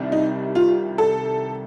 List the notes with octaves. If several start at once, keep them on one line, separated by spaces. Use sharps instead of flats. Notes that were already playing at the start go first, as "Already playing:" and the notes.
Already playing: C2 C3 D#3 G3
D#4
F4
A4